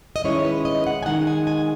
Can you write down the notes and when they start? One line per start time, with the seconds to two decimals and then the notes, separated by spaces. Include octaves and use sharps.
0.16 D#5
0.24 D#3 G#3 C#4 E4 C#5
0.45 B4
0.65 D#5
0.87 F#5
1.03 G#5
1.06 D#3 G#3 D#4 F#5
1.27 G#5
1.47 G#5